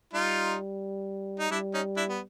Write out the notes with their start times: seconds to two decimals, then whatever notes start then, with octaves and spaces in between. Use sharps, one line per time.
0.13 G3 D#4 F4
1.40 D#4
1.51 G3 D4 E4
1.74 C#4 D#4
1.97 D4 E4
2.09 B3